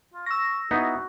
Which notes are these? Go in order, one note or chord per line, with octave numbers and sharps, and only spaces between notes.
F4
C#6 E6 A#6
B3 D#4 E4 F#4